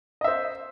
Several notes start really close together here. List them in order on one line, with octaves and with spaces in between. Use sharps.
D#5 E5 C5